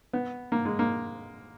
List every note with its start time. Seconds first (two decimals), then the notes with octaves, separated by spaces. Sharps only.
0.13 B3
0.52 A#3
0.65 G#3
0.79 A#3